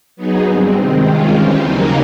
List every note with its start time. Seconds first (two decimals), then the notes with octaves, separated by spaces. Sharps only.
0.16 F#3 B3 D#4 G#4
0.44 G2 D#3 G3 C4
0.73 C3 D#3 G#3 C4
1.02 C3 D#3 G#3 C#4 F4
1.31 E3 G3 C4
1.59 D#2 C#3 F#3 A#3 D#4